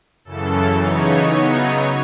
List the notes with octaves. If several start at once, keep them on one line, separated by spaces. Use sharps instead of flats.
F#2 C#3 E3 A4
C#3 E3 B3 D#4 C#5
C#3 F#3 B3 D#4